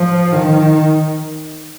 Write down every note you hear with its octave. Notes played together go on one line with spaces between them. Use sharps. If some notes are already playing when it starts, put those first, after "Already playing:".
Already playing: F3
D#3